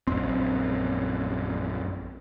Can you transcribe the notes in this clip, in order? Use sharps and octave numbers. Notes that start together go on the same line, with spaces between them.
A#1 F#2 C4